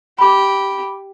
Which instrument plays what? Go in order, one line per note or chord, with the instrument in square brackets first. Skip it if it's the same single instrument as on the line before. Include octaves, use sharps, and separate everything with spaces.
[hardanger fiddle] G4 [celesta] B5 D6